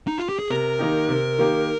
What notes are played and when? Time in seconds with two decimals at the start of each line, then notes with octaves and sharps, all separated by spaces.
0.08 D#4
0.18 F4
0.29 G4
0.39 G#4
0.50 C3 A#4
0.79 D#3 A#3 D#4 G4
1.09 C3
1.39 D#3 A#3 D#4 G4